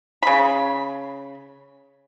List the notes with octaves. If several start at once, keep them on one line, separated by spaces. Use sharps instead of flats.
C#3 B5